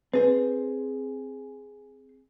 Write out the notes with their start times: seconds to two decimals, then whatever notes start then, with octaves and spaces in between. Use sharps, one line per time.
0.14 C4 G#4 B4 C5